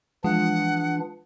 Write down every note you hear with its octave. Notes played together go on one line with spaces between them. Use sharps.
E3 F3 G#3 D4 F4 F#5